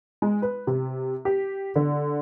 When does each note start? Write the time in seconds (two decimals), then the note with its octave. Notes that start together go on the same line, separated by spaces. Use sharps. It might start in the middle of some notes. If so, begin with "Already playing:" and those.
0.22 G#3
0.42 B4
0.67 C3
1.25 G4
1.76 D3